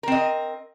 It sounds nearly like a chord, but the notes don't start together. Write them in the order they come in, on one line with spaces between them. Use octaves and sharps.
A#4 C4 D#5